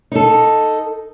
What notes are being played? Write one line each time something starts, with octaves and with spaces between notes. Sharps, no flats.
D#4 A4